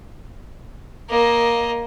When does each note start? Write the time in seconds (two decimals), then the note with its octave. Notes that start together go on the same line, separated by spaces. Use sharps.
1.10 A#3 D#5